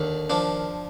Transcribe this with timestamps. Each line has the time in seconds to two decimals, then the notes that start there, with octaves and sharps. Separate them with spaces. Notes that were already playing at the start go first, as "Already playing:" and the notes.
Already playing: D#2 D3
0.30 F3 D4